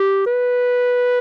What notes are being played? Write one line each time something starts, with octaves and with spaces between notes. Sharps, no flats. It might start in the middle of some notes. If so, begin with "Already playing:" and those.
Already playing: G4
B4